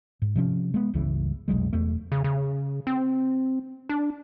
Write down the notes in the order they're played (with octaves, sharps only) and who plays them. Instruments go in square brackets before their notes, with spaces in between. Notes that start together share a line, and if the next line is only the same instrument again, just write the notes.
[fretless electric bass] G#2
C3 F3 C#4
G#3 B3
G1 C#2 C#3 E3
F1 B1 F#3 G#3
E1 E2 A3
[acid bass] C#3
C#3
C4
D4